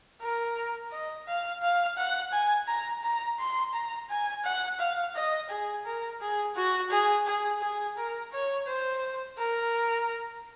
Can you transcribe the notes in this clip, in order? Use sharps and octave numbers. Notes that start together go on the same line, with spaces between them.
A#4
D#5
F5
F5
F#5
G#5
A#5
A#5
C6
A#5
G#5
F#5
F5
D#5
G#4
A#4
G#4
F#4
G#4
G#4
G#4
A#4
C#5
C5
A#4